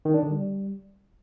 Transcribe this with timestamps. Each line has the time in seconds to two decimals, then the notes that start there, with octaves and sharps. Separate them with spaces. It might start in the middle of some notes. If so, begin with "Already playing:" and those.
0.05 D#3
0.14 D4
0.23 D3
0.31 G3